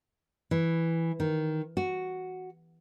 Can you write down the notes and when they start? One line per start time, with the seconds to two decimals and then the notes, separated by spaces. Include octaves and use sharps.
0.51 E3
1.20 D#3
1.77 F#4